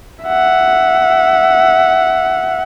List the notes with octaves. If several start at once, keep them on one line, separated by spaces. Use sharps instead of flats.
E5 F#5